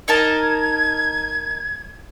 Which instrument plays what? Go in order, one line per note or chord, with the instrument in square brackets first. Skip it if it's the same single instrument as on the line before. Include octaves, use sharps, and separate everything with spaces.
[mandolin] D#4 A#4 A5 [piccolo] G#6